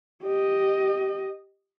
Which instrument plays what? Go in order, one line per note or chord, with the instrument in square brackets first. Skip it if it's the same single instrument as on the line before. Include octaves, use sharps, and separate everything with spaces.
[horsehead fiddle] G4 D#5